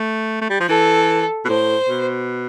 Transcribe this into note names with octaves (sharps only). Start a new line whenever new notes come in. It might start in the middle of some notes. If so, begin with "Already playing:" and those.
Already playing: A3
A3
G3
F3
E3 A4
B2
A2 C5
B2